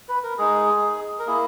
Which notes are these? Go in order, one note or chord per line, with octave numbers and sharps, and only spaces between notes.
B4
A#4
G#3 D#4 G#4
A#4
A#3 E4 G#4